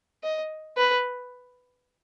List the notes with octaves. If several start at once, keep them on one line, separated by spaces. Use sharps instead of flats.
D#5
B4